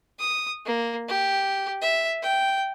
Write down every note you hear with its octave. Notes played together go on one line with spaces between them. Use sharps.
D#6
A#3
G4
E5
G5